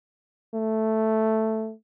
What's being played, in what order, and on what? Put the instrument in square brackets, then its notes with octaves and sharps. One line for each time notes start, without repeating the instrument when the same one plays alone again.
[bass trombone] A3